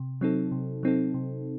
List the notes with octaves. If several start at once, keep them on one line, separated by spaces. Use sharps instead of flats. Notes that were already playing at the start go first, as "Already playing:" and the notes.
Already playing: C3
F#3 C4 D#4 A4
C3
F#3 C4 D#4 A4
C3